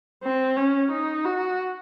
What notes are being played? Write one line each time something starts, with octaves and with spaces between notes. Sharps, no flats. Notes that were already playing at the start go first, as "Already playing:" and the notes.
C4
C#4
D#4
F#4